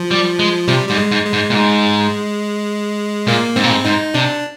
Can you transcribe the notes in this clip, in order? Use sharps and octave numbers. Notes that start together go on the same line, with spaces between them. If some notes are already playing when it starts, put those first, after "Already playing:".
Already playing: F3
G3
G#3
C3 G3
G#2 G3
G#3
G#2
G#3
G#2
A#2
G#2
A#2 A#3
G#2 C4
A#2
G#2
G#2 D#4
C3 D4